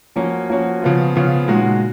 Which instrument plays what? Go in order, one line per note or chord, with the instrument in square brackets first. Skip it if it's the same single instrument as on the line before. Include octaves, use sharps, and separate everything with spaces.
[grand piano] F3 A#3 C#4 F#4
F3 A#3 C#4 F#4
C#3 F3 B3 F4
C#3 F3 B3 F4
A#2 G#3 D#4 F#4